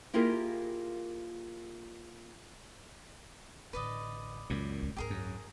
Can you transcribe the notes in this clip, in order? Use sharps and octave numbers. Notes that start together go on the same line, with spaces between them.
A#3 E4 F4 G4 G#4 A#4
A1 D3 B4 D5 D#5
C#2 F#2 A#2
D#1 D2
C#2 G#2 G4 G#4 A#4
F#2